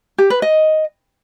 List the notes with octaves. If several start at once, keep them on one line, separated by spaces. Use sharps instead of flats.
G4
B4
D#5